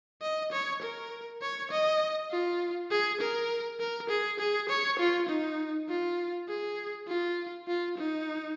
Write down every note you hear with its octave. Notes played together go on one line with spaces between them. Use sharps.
D#5
C#5
A#4
C#5
D#5
F4
G#4
A#4
A#4
G#4
G#4
C#5
F4
D#4
F4
G#4
F4
F4
D#4